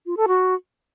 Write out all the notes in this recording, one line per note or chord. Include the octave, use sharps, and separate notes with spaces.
F4
A4
F#4